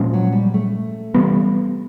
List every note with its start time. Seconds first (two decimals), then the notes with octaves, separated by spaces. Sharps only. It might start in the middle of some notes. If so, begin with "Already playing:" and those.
Already playing: A#2 F3 G#3 C#4
0.13 F#3
0.32 G3
0.54 A3
1.14 C3 E3 G3 B3